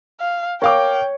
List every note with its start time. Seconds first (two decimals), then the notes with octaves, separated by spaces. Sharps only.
0.21 F5
0.62 A#4 C#5 F5 G5 D6